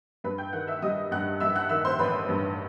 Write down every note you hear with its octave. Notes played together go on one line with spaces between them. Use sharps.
G2 B4 B5
G5 G6
D#3 F#5 F#6
E5 E6
G3 D#5 D#6
G2 F#5 F#6
G2 E5 E6
F#5 F#6
D#3 E5 E6
C5 C6
A1 B4 B5
G2